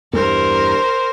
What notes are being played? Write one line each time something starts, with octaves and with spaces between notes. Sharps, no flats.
E2 G2 A#4 C5